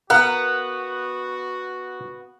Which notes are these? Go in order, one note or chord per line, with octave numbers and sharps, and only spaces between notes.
B3 F#4 A#4 F#5